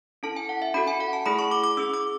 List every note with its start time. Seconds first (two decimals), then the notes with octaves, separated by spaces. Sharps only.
0.23 C#4 E4 A4 A5
0.36 G#5
0.49 F#5
0.62 E5
0.74 C#4 F#4 A4 B5
0.88 G#5
1.00 F#5
1.13 A5
1.26 A3 E4 G#4 B5
1.39 C#6
1.51 D6
1.64 D6
1.77 C#4 G#4 E6
1.94 D6